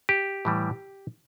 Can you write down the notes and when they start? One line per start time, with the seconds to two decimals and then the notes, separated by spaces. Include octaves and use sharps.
0.09 G4
0.45 A2 E3 G3